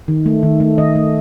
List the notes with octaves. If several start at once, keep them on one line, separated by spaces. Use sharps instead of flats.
D#3
A3
D#3
A3
D#3 D#5
A3